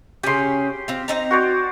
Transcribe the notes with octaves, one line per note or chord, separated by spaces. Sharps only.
C#3 C#4 G4 C6
C4 F4
C4 D#4 A#5
F#4 C5 D5